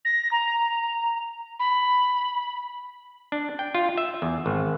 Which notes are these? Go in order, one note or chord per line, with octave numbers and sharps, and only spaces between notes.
A#6
A#5
B5
D4
G5
F4
E5
E2
G#1